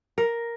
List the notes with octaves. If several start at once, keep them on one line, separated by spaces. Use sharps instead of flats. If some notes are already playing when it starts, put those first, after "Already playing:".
A#4